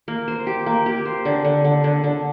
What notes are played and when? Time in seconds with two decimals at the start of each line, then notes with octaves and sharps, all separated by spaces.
0.08 A#3
0.28 C5
0.47 G4
0.66 A#3
0.86 G4
1.05 C5
1.25 D3
1.45 D3
1.65 D3
1.84 D3
2.04 D3